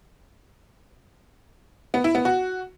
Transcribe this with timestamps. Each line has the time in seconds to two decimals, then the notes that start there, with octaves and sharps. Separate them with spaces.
1.94 B3
2.04 E4
2.15 B3
2.25 F#4